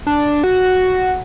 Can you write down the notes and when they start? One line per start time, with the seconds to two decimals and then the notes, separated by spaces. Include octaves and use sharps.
0.07 D4
0.44 F#4